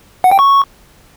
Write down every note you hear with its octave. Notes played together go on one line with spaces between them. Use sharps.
F#5
G5
C#6